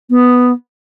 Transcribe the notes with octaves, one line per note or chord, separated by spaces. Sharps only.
B3